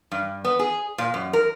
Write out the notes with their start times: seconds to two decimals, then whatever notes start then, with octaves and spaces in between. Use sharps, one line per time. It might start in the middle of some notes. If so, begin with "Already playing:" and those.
0.11 G2
0.44 B3
0.59 G#4
0.98 A#2
1.14 F#2
1.33 A#4